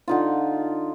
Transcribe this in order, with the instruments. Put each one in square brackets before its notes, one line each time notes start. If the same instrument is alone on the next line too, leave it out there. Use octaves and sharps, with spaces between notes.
[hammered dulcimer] D3 D#4 F4